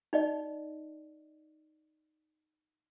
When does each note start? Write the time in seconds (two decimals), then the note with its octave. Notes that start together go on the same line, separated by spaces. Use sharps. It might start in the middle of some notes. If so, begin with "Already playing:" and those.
0.13 D#4 D5 D#5